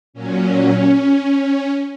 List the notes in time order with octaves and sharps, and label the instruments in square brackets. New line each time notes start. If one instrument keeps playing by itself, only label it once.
[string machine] A#2 F#3 C#4